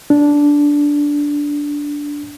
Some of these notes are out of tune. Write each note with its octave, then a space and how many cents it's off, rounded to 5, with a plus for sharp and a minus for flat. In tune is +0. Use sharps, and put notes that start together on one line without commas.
D4 -10